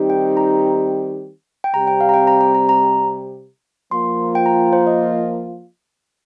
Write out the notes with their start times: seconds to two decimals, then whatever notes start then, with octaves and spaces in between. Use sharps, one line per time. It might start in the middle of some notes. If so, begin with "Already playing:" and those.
Already playing: D#3 G3 C4 D#4 G4
0.10 G5
0.37 A#5
1.64 G5
1.73 C3 G3 C4 G4 A#5
1.87 G5
2.01 F5
2.09 A#5
2.14 G5
2.27 A#5
2.41 A#5
2.55 A#5
2.69 A#5
3.91 F3 A#3 F4 C6
4.35 G5
4.46 A#5
4.73 C5
4.87 D#5